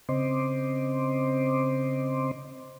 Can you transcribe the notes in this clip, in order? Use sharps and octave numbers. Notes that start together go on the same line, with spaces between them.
C#3 C4 C5 D#5 C6 D6